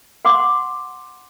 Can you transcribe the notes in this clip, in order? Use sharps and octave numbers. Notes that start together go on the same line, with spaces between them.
F#5 C6 D6